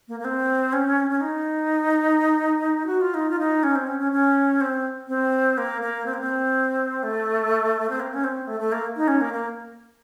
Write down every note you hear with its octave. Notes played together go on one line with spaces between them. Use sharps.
A#3
A#3
C4
C#4
C#4
D#4
F#4
F4
D#4
F4
D#4
C#4
C4
C#4
C#4
C#4
C4
C4
A#3
A#3
C4
A#3
C4
A3
C4
A#3
C#4
C4
A3
A3
A#3
D#4
C#4
A#3
A#3